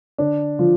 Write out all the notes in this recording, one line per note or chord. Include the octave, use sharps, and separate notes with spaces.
D3 D4
D3 F3 F4